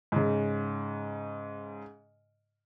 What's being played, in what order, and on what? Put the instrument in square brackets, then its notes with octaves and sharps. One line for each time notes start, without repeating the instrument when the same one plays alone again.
[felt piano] G#2 C#3